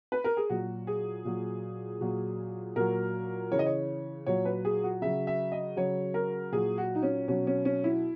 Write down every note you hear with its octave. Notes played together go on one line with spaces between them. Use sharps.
B4
A#4
G#4
A#2 F#3 F#4
G#4
A#2 F#3
A#2 F#3
A#2 F#3 A#4
C#3 E3 C#5
D#5
C#5
A#2 F#3 C#5
B4
G#4
F#4
C#3 F#3 E5
E5
D#5
C#3 F#3 C#5
A#4
A#2 F#3 G#4
F#4
D#4
C#4
B2 F#3 C#4
C#4
C#4
E4